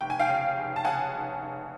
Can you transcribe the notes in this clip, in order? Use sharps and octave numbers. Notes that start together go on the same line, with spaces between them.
F1 G5
G#5
F5 G5
C#3
F1
A5
C#3 F#5 G#5
F1
F1